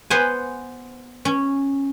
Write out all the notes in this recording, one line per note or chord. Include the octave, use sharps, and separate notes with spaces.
B3 C5 F#5 G#5
C#4